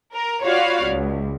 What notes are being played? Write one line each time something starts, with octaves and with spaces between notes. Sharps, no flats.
A#4
F4 F#4 C#5 D5 F5 B5
C#2